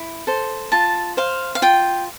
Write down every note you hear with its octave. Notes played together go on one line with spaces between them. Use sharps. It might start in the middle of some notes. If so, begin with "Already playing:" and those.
Already playing: E4
A4 C5
F4 A5
C5 F5
F5
F4 G5